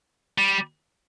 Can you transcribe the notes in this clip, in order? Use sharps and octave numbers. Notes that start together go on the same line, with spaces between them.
G3